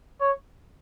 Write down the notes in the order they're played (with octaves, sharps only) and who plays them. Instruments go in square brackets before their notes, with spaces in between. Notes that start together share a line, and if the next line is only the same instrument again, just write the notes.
[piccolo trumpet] C#5